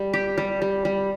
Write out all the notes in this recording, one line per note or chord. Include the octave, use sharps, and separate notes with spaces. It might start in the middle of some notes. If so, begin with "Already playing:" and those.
Already playing: G3
G4
G3
G3
G3